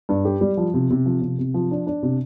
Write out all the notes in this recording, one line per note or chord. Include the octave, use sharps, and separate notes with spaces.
G2
G4
G3
F3
C3
C3
F3
C3
C3
F3
D4
D4
C3